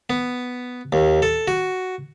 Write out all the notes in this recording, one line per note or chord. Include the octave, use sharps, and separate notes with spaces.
B3
D#2
A4
F#4